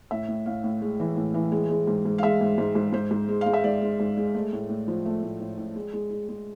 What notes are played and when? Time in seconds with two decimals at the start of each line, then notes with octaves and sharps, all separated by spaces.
0.11 A2 E5
0.28 A2
0.46 A2 F5
0.64 A2
0.82 G#3
1.00 E3
1.17 A2
1.34 E3
1.52 G#3
1.70 G#3
1.87 G#2
2.05 G#2
2.18 F5
2.23 G#3 E5
2.41 G#2
2.58 G#2
2.75 G#2
2.93 G#2 C5
3.11 G#2
3.29 G#3
3.41 G#3 F5
3.53 E5
3.64 G#2 D5
3.81 G#3
4.00 G#2
4.17 G#3
4.35 A3
4.53 A2
4.69 A2
4.88 F3
5.06 A3
5.23 A2
5.40 A2
5.58 A2
5.76 G#3
5.93 G#3
6.11 G#3
6.29 G#3